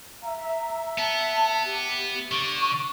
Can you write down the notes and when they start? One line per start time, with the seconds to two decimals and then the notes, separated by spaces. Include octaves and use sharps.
0.23 E5 A#5
0.98 B3 A5
1.65 G4
2.32 D3 C#6